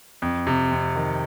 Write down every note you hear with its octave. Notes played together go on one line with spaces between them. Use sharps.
F2
C3
F2
D#3